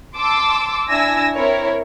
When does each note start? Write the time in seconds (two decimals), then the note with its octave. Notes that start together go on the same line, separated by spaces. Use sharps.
0.18 A5 C6 D6 E6
0.89 D4 E4 G#5 E6 A#6
1.34 C4 E4 A#4 C#5